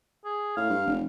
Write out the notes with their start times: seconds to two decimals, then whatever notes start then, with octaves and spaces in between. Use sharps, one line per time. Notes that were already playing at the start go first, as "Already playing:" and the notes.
0.25 G#4
0.56 A2 F5
0.70 G2
0.87 F1